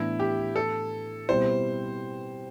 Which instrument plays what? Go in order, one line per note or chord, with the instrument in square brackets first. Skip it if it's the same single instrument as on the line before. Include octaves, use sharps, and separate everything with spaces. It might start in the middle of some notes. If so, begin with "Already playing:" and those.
Already playing: [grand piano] A2 E3 B3 D4 [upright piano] E4
[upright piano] G4
A4
[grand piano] B2 G3 C4 E4 [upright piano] C5